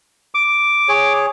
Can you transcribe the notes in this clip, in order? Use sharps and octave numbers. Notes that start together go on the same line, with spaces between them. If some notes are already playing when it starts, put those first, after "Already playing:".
D6
G#4 C#5